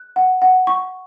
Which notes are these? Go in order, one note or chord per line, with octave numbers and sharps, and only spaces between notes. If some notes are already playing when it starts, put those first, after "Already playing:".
Already playing: F#6
F#5
F#5
C#6